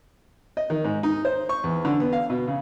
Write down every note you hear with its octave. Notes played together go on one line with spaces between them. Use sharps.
D#5
D#3
G#2
D#4
C5
C#6
E2
D3
B3
F5
B2
C#3